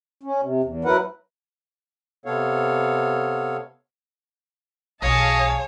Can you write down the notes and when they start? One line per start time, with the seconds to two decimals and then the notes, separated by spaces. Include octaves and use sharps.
0.23 C#4
0.42 C3
0.64 E2
0.85 F#3 E4 A#4 B4 F#5
2.26 C3 B3 A4 C#5 F5
5.02 B1 E2 G#4 C#5 D#5 F5 A5